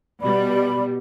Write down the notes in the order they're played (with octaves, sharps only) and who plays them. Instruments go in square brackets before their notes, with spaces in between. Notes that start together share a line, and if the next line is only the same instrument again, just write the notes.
[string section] B2 G3 [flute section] D5 B5